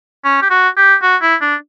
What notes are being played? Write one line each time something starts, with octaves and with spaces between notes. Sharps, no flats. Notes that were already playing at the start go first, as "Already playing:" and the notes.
C#4
G4
F#4
G4
F#4
E4
D4